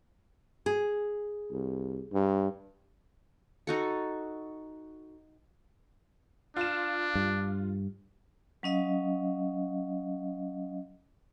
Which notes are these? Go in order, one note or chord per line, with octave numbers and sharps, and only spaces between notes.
G#4
C2
G2
D#4 F#4 A4
D4 F4 E7
G2
F#3 C#4 D#5 F5